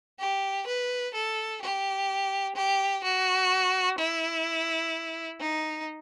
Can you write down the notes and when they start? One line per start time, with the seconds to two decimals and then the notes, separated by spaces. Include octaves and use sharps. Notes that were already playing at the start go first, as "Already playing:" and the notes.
0.19 G4
0.67 B4
1.14 A4
1.62 G4
2.56 G4
3.04 F#4
3.98 E4
5.41 D#4